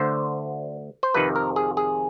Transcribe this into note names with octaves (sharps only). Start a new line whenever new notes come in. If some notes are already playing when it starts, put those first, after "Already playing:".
Already playing: D2 D3 C5
C5
F2 C3 D#3 B4
A#4
G#4
G#4